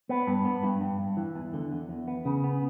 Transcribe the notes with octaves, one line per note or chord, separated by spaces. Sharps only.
B3
G2
B3
G2
G2
G2
E3
E2
D3
E2
E2
B3
C#3
B3